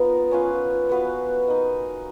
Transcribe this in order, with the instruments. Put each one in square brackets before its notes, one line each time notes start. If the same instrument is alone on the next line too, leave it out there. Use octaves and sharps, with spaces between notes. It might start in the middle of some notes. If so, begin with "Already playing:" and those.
Already playing: [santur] B3 D#4 F4 A#4
C#4 F4 B4 F5
B3 F#4 B4 F5
D#4 A#4 D#5